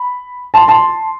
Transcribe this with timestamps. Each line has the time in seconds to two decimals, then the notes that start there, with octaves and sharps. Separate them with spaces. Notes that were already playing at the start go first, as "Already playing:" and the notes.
Already playing: B5
0.54 A5 C6
0.68 A5 C6